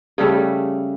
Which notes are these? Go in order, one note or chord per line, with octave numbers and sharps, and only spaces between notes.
C#3 G3 A3